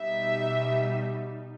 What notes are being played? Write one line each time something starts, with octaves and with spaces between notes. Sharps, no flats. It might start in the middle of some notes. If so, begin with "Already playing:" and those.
Already playing: B2 G3 D#4 E5